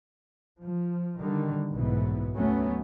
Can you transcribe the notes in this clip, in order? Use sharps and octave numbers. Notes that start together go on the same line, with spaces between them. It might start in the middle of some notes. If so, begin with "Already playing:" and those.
F3
D3 D#3 G3
F#1 B1 G#2 B2 E3 B3
D2 F#3 A3 B3 C#4